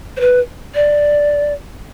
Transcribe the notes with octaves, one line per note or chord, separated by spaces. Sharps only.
C5
B4
D5